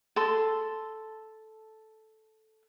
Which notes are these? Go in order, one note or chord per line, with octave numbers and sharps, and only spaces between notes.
A4 C6